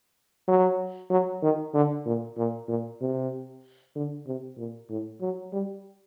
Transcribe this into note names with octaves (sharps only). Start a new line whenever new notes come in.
F#3
F#3
D#3
D3
A#2
A#2
A#2
C3
D3
C3
A#2
A2
F#3
G3